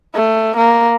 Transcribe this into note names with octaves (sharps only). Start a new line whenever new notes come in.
A3
A#3